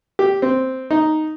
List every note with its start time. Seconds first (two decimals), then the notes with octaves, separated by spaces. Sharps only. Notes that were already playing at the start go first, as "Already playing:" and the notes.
0.19 G4
0.42 C4
0.91 D#4